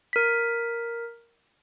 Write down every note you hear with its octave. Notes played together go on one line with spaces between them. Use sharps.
A#4 B6